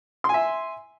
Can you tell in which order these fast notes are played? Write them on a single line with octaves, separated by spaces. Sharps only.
C6 G#5 E5